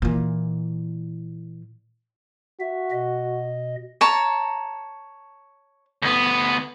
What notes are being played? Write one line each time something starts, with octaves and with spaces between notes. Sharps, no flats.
A#2 E3
F#4 E5
B2 D#5
C#5 A5 A#5
D2 B3